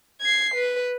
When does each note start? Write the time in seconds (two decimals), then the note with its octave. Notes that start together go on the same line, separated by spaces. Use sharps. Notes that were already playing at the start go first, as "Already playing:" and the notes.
0.21 G#6 C7
0.55 B4